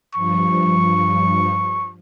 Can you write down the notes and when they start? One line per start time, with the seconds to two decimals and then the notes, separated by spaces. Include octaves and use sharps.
0.14 G2 F3 C#6